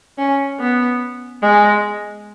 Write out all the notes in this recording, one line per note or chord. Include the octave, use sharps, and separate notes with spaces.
C#4
B3
G#3